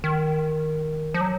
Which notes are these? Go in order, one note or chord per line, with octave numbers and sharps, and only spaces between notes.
D#3
F3
F#3